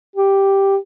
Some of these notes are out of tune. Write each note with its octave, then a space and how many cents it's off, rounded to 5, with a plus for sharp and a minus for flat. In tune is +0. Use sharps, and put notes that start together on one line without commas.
G4 +0